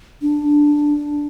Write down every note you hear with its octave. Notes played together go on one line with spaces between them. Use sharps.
D4